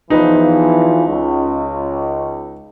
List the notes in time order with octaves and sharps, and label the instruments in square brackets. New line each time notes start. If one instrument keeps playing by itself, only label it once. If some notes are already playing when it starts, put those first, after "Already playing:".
[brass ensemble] E2 E3 F3 [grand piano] D#4 B4
[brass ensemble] C#2